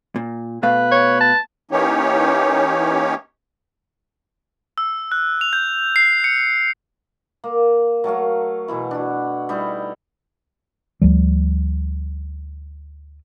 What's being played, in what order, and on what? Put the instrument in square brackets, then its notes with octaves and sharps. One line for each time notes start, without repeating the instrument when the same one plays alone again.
[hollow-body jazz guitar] A#2
[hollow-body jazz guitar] B2 A3 F5 [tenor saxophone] B4
[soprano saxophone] C#5
A5
[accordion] E3 A#3 C#4 D#4 G4 C#5
[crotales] E6
F#6
F7
G6
C7
C#7
[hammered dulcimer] A#3
F#3 A3 A#4 F5
B2 E3 E4
D4 F#4
G3 D#4 E4
[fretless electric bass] D2 F3 G3